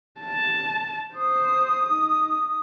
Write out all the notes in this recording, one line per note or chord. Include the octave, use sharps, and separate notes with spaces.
A5
C5 D#6
D#4